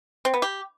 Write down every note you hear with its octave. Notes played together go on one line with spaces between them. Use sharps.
C4
B3
G4